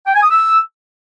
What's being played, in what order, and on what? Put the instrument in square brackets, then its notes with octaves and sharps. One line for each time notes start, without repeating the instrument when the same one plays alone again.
[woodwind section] G5
G#5
D#6
E6